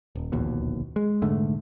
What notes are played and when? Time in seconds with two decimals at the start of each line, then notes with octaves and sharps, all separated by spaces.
0.15 D#1
0.32 D1 A#1 D#2 B2
0.96 G#3
1.22 F1 G#2 D3 A3